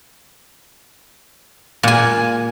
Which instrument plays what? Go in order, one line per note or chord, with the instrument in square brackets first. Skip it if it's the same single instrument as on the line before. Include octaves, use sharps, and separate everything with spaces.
[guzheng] A#2 G#5